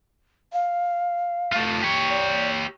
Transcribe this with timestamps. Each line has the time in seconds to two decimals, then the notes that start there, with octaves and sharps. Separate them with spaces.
0.53 F5
1.52 A3 F4
1.82 G4 C#5
2.09 D5